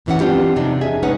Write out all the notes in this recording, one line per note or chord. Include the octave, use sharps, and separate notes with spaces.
E2 A2 E3 F#3 C#4 F#5
B3 C4 D4 F4 G4
F2 C3 D4 D#4
G#4 E5 G#5
G#3 C#4 D#4 B4 C#5 F#5